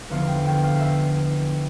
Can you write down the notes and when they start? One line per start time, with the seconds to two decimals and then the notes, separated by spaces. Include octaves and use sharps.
0.10 E2 D3 F3 B3 F5
0.27 G5
0.45 G5
0.63 F5
0.79 E5